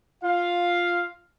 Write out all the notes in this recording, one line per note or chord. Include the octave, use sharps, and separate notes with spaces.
F4 F5